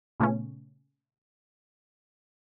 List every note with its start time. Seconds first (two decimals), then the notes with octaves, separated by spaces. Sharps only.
0.20 A#2 C#3 A3 B3 C#4